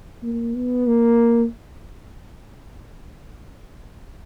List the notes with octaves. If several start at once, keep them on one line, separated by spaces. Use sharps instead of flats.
A#3
B3
A#3